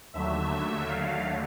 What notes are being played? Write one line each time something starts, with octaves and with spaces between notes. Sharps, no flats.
D#2 D3 F#3 A3 E5
F5